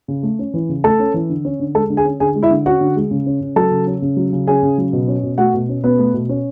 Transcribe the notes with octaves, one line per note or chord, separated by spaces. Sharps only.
C#3
A3
C#4
E3
C#3
A3 A4 A5
C#4
E3
D3
C#4
D3
G#3 A4 A5
D3
G#4 G#5
C#4
D3 G#4 G#5
G#3
E4 E5
D3
C#4 F#4 F#5
D3
G#3
C#3
C#4
C#3
F#3 A4 A5
C#3
C#4
C#3
F#3
C#3
C#4 G#4 G#5
C#3
F#3
B2
C#4
B2
A3 F#4 F#5
B2
C#4
B2 B3 B4
A3
B2
C#4